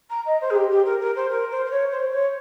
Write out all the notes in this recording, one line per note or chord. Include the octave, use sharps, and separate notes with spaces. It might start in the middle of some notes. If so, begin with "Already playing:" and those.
A#5
D#5
C5
G#4
G4
G4
A#4
A#4
C5
A#4
C5
C5
C#5
C5
C#5